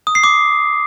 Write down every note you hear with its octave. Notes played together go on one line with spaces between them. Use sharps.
D#6
C7
D6